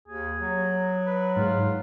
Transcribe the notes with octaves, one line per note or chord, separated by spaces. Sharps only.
D#2 G#4
F#3
B4
G#2 F4